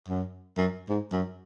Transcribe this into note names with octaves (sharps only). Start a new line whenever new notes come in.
F#2
F#2
G#2
F#2